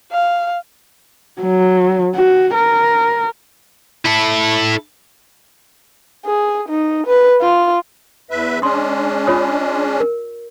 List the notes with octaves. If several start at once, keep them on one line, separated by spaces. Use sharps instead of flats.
F5
F#3
F#4
A#4
E4 A4
G#4
D#4
B4
F4
E2 B4 E5
G#3 C#4 D4 C6 D#6
F4 C#5 D#6
A#4